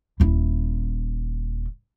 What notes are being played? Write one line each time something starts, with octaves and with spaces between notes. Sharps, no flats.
D#1 E4